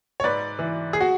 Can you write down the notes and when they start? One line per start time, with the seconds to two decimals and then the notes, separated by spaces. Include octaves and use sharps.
0.20 C#5
0.24 G#2 B4 D5
0.59 E3
0.93 G#4
1.01 F#4